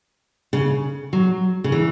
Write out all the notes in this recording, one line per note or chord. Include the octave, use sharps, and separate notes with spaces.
C#3
F#3
C#3
E3